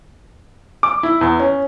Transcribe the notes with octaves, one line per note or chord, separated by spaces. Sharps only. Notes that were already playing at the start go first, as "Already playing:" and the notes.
D6
E4
E2
C#4